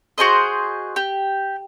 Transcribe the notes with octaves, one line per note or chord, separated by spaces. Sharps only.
F#4 G#4 C5 D#5
G4